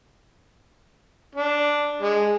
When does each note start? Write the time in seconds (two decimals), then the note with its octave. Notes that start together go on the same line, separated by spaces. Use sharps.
1.35 D4
2.02 G#3